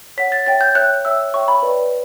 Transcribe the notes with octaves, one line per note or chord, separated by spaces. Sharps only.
C#5 F#5 B6
A6
C#5 E5 G5 A6
G6
C#5 E5 G5 F#6
C#5 E5 G5 E6
C#5 E5 G5 C#6
B5
B4 D5 G5